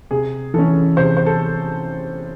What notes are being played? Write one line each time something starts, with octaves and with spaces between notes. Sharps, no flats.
C3 G#4
E3 A3 C#4 A4
C3 C5
C5
A4